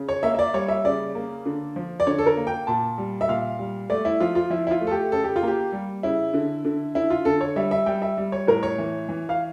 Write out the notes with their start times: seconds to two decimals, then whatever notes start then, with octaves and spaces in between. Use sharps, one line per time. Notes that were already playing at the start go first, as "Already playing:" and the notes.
Already playing: C#3
0.09 C#5
0.23 A#3 E5
0.34 E5
0.39 D5
0.54 G3 C#5
0.68 E5
0.85 C#3 D5
1.15 A#3
1.46 D3
1.76 F3
2.00 D5
2.07 D3 C#5
2.18 A4
2.26 A#4
2.37 A#3
2.47 G5
2.67 A#2 A5
2.98 G3
3.21 E5
3.29 A#2 F5
3.59 G3
3.90 A3 D5
4.05 E4
4.20 F3 F4
4.35 F4
4.50 F3 E4
4.67 E4
4.71 F4
4.81 A3
4.87 A4
4.91 G4
5.12 C#3 A4
5.24 G4
5.36 F4
5.43 A#3 G4
5.72 G3
6.03 C#3 E4
6.34 D3
6.65 D3
6.95 D3 E4
7.10 F4
7.25 D3 A4
7.41 C#5
7.56 G3 E5
7.71 E5
7.86 G3 G5
8.02 E5
8.17 G3
8.32 C#5
8.48 A2 A#4
8.63 C#5
8.78 E3
9.09 E3
9.29 F5